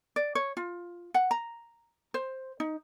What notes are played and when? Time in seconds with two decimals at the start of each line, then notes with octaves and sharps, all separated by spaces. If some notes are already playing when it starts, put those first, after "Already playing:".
0.16 D5
0.35 C#5
0.57 F4
1.14 F#5
1.31 A#5
2.14 C5
2.60 D#4